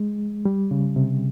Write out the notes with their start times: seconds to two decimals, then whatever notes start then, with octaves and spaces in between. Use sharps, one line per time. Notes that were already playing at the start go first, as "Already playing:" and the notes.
Already playing: G#3
0.45 G3
0.71 C#3
0.96 C3